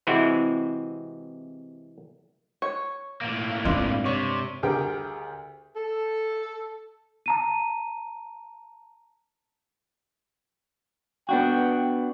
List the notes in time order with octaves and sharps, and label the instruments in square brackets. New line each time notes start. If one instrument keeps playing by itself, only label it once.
[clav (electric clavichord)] C3 E3 G#3 C4 E4 F#4
[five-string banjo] C#5
[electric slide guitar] A2 A#3
[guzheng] G2 [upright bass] G#3 C4 [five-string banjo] F4
[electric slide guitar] C3 [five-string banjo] C#5 D5
[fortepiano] D2 G3 G4 G#4 A#4 G5
[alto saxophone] A4
[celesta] A5 A#5 D#7
[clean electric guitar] B3 D4 F#4 [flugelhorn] G5